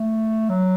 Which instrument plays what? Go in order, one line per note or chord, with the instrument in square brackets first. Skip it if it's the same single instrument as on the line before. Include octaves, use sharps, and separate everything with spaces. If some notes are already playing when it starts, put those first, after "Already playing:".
Already playing: [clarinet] A3
F#3